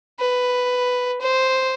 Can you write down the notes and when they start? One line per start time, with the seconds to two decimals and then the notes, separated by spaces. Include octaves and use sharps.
0.19 B4
1.21 C5